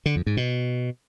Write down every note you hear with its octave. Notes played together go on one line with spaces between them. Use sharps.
D3
F2
G#2
B2